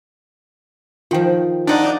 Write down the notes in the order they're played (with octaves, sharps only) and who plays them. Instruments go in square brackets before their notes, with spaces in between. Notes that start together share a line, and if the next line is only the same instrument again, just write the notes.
[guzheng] D#3 F3 [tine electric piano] F4 G5
[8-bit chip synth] D4 D#4 D5 [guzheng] F4 F#5